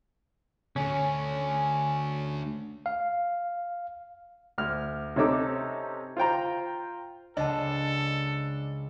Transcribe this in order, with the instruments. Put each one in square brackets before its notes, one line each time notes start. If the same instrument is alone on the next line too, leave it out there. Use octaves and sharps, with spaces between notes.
[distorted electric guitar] D3 A3 [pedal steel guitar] C#4
[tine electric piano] F5
[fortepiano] D2 F6
C3 C#4 D#4 A4 D6
F4 C5 G5 A#5
[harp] C#2 [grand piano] D4 [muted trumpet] A4 [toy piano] D#5 A5